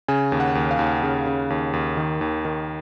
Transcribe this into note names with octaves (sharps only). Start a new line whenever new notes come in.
C#3 G#5
D#2
F#5
D#2
F5
D#2
C#3
C#3
D#2
D#2
D#3
D#2
D#3